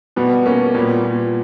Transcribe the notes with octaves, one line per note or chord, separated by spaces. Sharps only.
B2 G3 B3
B2 A#3 C#4
A#2 G3 B3
A#2